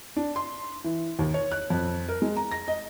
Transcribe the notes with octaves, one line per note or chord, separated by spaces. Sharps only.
D4
C6
E3
D#2
C#5
F#6
F2
A#4
G#3
A#5
A#6
D#5